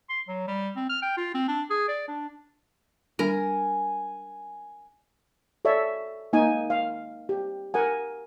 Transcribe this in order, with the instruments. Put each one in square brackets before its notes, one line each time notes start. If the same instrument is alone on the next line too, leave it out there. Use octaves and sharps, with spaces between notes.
[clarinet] C6
F#3
G3
C4
F6
G5
F4
C4
D4
G#4
D5
D4
[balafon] G3 D4 [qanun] A#4 [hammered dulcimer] G#5
[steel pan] A4 C#5 D5 E5
A#3 D#4 G#5
F5
G4
A#4 F#5 G#5